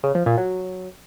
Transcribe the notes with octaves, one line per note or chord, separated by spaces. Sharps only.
C#3
F3
A#2
F#3